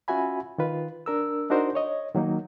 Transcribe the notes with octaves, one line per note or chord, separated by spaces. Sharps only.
C#4 F4 F#4 E5 G#5 B5
D#3 F4 B4
D4 A#4 E6
D4 D#4 F#4 A#4 C5
C#5 D#5
D#3 F#3 A#3 D#4